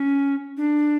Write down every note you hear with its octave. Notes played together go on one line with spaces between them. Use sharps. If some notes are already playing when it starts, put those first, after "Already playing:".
Already playing: C#4
D4